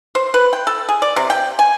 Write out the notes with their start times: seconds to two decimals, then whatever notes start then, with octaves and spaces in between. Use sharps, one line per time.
0.15 C5
0.34 B4
0.53 G5
0.67 A4
0.89 G#4
1.02 D5
1.16 C3
1.30 G5
1.59 G#5